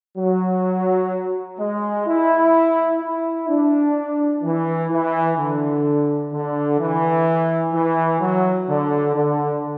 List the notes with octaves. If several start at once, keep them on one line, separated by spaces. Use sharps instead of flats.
F#3
G#3
E4
E4
D4
E3
E3
D3
D3
E3
E3
F#3
D3
D3